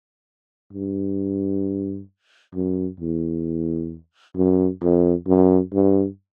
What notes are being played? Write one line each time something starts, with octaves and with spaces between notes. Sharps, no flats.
G2
F#2
E2
F#2
F2
F#2
G2